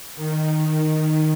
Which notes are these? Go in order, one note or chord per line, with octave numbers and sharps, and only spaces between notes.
D#3